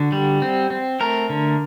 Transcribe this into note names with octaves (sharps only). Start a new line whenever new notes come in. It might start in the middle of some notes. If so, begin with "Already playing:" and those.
Already playing: D3 F#4
G3
C4
C4
A3 A#4
D3